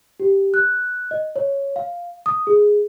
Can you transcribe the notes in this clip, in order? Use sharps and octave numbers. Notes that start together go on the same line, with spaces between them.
G4
F#6
D#5
C#5
F5
D#6
G#4